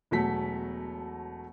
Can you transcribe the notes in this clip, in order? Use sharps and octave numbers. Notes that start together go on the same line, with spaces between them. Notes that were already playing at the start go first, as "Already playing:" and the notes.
E1 B2 F#3 A3 B6